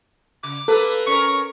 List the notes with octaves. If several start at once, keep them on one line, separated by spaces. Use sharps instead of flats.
C#3 D6
A#3 A4 B4
C#4 A#4 C#6